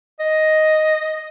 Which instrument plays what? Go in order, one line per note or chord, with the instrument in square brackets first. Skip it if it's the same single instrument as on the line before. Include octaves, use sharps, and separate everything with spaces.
[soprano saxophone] D#5